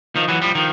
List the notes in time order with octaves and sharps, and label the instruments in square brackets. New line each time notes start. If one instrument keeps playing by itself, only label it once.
[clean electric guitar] D#3 F3
E3 F#3
F3 G3
D#3 F3